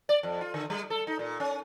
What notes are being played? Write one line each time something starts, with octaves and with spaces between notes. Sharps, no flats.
D5
F2
F4
D3
G3
A4
D#4
A#2
C#4